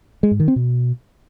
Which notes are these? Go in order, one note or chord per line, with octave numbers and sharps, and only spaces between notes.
G#3
G#2
D#3
C4
B2